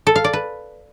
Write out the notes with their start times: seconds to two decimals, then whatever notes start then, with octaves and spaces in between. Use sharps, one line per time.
0.07 A4
0.16 F5
0.24 D5
0.33 B4